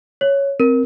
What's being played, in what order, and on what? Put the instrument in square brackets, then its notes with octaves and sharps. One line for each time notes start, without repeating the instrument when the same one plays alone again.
[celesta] C#5
[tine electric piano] C4 [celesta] A#4